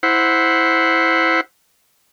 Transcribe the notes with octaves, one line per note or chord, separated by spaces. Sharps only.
E4 C5 F#5